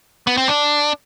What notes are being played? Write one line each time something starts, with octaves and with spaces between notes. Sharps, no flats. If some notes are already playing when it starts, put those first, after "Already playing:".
B3
C4
D4